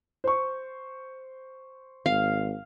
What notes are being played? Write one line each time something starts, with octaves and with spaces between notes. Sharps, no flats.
C5 C#6
G#1 F5